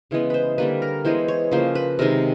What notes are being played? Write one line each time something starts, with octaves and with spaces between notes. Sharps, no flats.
C#3 E3 G#3 B3
B4 C5
D3 G3 A#3 B4
A#4
E3 G#3 B3 C5
C#5
C#3 F3 A#3 C5
B4
C3 D#3 G#3 A#4